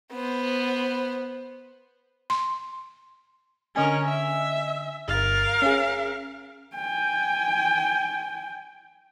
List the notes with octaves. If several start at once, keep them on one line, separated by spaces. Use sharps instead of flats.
B3 C5
C6
D3 C#4 A#4 D#5 G#5
E5
G1 A#4 F5 A6
C#4 G#4
G5 G#5